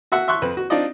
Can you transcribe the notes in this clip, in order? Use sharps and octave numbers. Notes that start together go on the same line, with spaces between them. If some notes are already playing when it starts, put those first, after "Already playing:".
F#4 E5 F#5 E6
E5 C6 C#6 F#6
F2 C4 B4
F#4
C4 D4 D#4 F4 D5 D#5